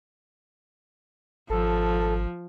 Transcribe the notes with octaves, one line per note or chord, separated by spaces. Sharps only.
G#1 F3 A4